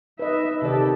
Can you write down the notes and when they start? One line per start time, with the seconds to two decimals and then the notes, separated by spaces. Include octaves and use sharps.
0.19 D#4 B4 D#5 E5
0.62 C3 D#3 G4 A4 D5